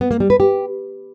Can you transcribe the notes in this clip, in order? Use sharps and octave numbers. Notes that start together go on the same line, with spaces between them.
B3
A#3
G3
B4
G4